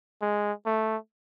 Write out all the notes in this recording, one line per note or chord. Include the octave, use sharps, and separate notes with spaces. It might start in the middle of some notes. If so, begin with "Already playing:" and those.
G#3
A3